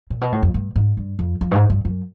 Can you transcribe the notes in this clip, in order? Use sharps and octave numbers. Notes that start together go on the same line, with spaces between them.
A#2
B2
A2
F2
G2
G#2
G2
F2
F2
G2
G#2
G2
F#2